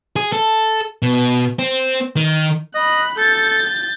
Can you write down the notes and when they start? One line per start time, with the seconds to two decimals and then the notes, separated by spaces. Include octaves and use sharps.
0.16 G#4
0.33 A4
1.02 B2
1.59 C4
2.16 D#3
2.75 D#5 B5 F#6
3.18 A4 G6 A6